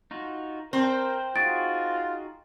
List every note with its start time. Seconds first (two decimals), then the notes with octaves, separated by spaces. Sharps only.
0.11 D#4 F4 F#4
0.73 C4 A#4 C5
1.36 D#4 F4 F#4 G#4 A6 D7